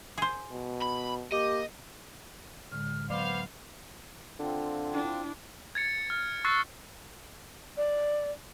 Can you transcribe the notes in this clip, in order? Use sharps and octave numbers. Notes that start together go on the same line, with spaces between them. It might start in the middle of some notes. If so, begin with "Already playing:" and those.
G#4 C5
B2
B5
A#3 G4 D#5
A2 D3 G#3 F6
F#3 B3 C5 F5 D6
D3 C4 F4
D4 E4
G#6 A6 C#7
F6
C#6 E6 F#6 A6 C7
D5